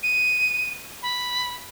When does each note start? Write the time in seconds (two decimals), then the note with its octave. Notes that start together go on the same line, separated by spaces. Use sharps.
0.03 D#7
1.02 B5